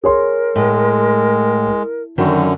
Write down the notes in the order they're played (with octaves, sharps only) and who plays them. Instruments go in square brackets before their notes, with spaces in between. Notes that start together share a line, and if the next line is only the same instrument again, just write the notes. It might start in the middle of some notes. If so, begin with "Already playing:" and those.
[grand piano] G#4 C#5 C6 [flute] A#4
[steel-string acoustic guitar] A2 [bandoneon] G#3
[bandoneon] F#2 D3 [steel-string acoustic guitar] D#3 F#3